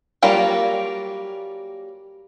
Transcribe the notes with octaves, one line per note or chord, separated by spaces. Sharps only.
F#3 G3 A#3 C#4 F4